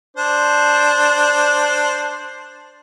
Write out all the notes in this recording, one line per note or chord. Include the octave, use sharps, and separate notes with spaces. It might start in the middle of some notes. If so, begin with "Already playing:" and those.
D4 C5